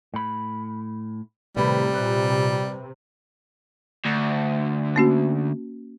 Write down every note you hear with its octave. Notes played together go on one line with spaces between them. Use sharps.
A2 B5
A2 C3 D#3 G3 B4 B5
A#2 B4
D2
A#3 C#4 F#4